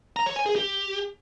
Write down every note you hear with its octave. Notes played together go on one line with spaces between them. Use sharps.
A#5
C#5
G#5
G#4
G4